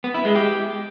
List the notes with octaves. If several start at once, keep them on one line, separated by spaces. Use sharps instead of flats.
B3
E4
G#3
G4